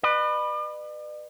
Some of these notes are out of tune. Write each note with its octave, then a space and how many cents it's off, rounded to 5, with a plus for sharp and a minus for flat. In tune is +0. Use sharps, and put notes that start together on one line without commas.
B4 +0 D5 +45